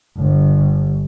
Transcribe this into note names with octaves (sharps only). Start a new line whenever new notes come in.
G1